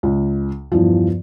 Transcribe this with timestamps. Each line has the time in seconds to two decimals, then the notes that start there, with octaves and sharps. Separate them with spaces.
0.03 C#2
0.72 E2 G2 E3 F3